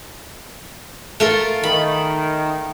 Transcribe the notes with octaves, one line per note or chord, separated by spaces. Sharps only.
A3 F4 A#4
D#3 B5